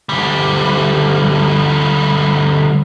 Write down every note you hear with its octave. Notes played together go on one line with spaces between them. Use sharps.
D2 G3